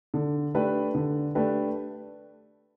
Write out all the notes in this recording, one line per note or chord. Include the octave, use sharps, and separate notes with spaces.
D3
A3 D4 G4 B4
D3
A3 D4 G4 B4